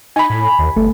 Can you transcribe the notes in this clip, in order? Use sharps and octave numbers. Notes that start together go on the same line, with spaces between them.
D#4 G#5 B5
A2
D#2
G1 A3